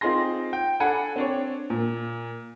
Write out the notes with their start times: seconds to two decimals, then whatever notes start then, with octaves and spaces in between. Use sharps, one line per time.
0.01 C4 D#4 F4 G#4 C6 A#6
0.53 G5
0.80 D4 A4 F#5 G#5 B5
1.16 C4 D4 C#5
1.70 A#2